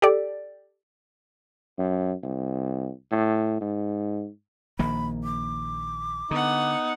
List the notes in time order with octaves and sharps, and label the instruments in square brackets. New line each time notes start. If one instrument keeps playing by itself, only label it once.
[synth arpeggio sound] G4 A4 D5
[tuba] F#2
C2
A2
G#2
[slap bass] A#1 D#3 A#3 [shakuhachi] B5
[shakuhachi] D6
[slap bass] D3 [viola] B3 F#5 [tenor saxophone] D#4